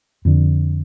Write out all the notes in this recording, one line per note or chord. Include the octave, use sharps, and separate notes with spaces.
F2 D3